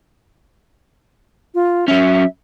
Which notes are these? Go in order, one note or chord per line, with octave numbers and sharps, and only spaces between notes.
F4
F#3 C#4 E5